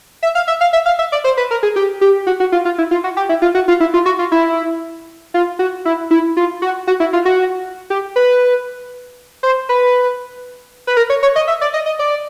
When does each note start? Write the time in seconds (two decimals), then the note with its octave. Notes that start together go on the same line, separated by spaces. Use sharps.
0.23 E5
0.35 F5
0.48 E5
0.61 F5
0.73 E5
0.86 F5
0.99 E5
1.12 D5
1.24 C5
1.37 B4
1.51 A#4
1.63 G#4
1.76 G4
2.01 G4
2.27 F#4
2.40 F#4
2.52 F4
2.65 F4
2.78 E4
2.91 F4
3.04 F#4
3.17 G4
3.29 E4
3.42 F4
3.55 F#4
3.68 F4
3.80 E4
3.94 F4
4.06 F#4
4.19 F4
4.32 E4
5.34 F4
5.59 F#4
5.85 E4
6.11 E4
6.37 F4
6.62 F#4
6.87 F#4
7.00 E4
7.13 F4
7.25 F#4
7.90 G4
8.16 B4
9.43 C5
9.69 B4
10.87 B4
10.97 A#4
11.10 C#5
11.23 C#5
11.36 D#5
11.48 E5
11.61 D5
11.74 D#5
11.86 D#5
11.99 D5